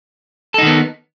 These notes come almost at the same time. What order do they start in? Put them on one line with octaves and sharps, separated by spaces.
A4 D#4 D#3 B3